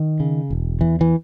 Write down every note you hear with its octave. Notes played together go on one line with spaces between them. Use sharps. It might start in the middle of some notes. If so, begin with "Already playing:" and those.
Already playing: D#3
C#3
E1
E2 E3
E3